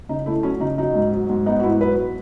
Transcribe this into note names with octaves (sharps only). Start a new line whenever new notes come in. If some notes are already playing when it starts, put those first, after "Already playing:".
C#3 D#4
A3 E4
F#3 C#4
C#3 D#4
F#3 D#4
G#2
F#3
G#2
B3 D#4
F#4
G#2 E4
F#3 B4